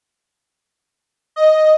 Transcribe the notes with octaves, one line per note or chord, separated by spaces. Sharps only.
D#5